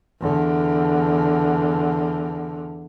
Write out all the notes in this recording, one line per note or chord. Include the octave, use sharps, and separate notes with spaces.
E2 D3